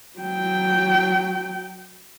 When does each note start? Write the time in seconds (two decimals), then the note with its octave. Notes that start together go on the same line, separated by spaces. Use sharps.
0.19 F#3 G5